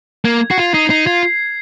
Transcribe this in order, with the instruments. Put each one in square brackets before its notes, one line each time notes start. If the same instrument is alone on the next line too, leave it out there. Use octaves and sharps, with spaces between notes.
[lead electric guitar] A#3 [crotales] G#6
[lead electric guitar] F#4 [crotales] C7
[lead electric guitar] F4
[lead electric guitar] D#4 [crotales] C7
[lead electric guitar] D#4 [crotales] C7
[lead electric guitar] F4 [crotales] G#6